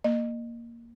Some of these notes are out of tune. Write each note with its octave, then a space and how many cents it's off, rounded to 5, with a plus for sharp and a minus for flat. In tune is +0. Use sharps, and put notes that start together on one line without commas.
A#3 +0 D#5 -25